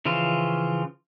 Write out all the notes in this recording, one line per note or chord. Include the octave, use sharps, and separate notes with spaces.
C#3 E3 F3 F4